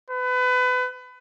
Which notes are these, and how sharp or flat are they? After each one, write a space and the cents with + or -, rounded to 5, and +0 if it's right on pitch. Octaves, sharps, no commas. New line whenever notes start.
B4 +30